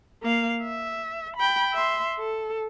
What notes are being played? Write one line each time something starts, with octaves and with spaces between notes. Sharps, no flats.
A#3 F5
E5
G5 B5
E5 C6
A4